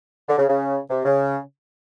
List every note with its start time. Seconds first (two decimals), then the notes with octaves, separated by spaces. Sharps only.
0.29 D3
0.38 C#3
0.49 C#3
0.90 C3
1.05 C#3